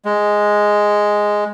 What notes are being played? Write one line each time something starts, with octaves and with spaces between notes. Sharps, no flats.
G#3